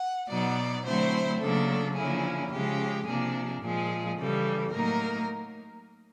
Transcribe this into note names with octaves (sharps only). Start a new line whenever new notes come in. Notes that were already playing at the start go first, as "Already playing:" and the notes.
Already playing: F#5
B2 F#3 B3 D#4 D5
D3 F#3 A3 C4 E4 C5
C#3 F#3 A#3 D4 A4
D3 F3 A#3 C#4 E4 G#4
C#3 F3 G#3 C#4 G4
C3 F3 A#3 D4 G#4
A#2 F3 G#3 G#4
C#3 E3 G3 A4
A2 F#3 A#3 D#4 A#4